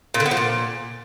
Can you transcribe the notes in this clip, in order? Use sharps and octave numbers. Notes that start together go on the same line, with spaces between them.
A#2
D3
B3
F3
A#2